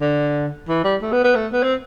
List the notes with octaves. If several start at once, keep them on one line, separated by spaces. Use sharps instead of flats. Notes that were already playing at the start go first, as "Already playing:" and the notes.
D3
E3
G3
A3
B3
B3
A3
B3
C4